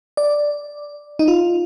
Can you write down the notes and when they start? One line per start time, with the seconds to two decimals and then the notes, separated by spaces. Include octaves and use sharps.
0.17 D5
1.19 D#4
1.28 F4